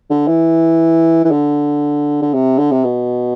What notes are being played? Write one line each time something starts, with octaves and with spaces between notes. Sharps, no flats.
D3
E3
E3
D3
D3
C3
D3
C3
B2